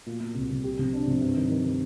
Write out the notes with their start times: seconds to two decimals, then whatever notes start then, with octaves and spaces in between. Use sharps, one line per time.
0.06 A#2
0.20 A#2
0.35 C2
0.49 C2
0.64 G4
0.79 C3
0.93 D4
1.07 C3
1.21 G2
1.36 D#3
1.50 D#3
1.65 D#3